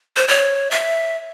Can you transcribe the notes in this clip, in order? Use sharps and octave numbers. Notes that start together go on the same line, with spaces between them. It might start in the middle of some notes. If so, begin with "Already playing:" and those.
C5
C#5
E5